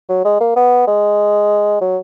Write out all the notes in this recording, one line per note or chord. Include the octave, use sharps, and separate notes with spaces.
F#3
G#3
A#3
B3
G#3
F#3